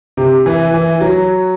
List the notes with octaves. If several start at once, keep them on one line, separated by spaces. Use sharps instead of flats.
C3
E3
E3
F#3